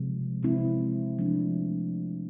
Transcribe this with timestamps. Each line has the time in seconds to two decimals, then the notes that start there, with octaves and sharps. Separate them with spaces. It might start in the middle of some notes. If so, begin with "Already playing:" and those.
Already playing: C3 F3 G#3
0.43 C3 G#3 C4 E4
1.19 F3 A3 D4